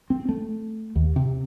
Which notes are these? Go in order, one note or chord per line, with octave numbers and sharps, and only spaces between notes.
C4
A3
D#2
C3